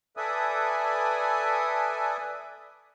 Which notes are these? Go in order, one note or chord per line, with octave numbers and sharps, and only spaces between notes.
A4 B4 D5 E5 G#5 D#6